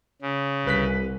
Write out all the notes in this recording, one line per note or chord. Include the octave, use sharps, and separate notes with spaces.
C#3
C2 B4 F#6 B6